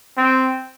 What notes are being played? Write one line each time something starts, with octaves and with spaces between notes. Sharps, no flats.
C4